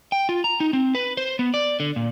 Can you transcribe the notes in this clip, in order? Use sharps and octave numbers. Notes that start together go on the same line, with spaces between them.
G5
F4
A#5
D#4
C4
B4
C5
B3
D5
D3
A#2